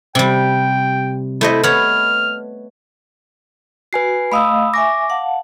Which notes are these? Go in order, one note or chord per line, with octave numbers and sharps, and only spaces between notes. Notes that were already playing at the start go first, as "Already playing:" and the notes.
C3 G3 G5
A3 E4 C5 D#5
B3 C#5 F6
F#4 B4 G#5 C7
A3 D#5 F5 B5 D#6 E6
E5 G#5 C#6 D6 A#6
F5 F#5 A5